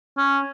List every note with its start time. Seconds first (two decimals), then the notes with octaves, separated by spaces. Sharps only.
0.18 C#4